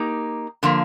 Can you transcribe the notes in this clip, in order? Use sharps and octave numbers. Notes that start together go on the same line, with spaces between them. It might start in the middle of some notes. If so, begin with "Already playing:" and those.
Already playing: A#3 D#4 G4
D3 F3 A#3